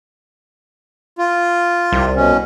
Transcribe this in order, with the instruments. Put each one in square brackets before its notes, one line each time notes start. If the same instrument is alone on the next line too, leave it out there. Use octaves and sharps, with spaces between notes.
[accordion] F4
[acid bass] C2
[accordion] B2 C#4